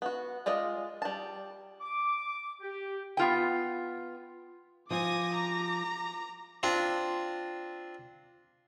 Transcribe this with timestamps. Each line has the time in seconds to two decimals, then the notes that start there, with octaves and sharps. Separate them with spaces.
0.02 B3 F#4
0.46 G#3 F4 D5 D#5
1.02 G3 A5
1.81 D6
2.61 G4
3.17 B3 F4 G5
4.91 F3 F4 G#5 D6 D#6 A#6
5.33 A#5
6.63 C4 D4 F4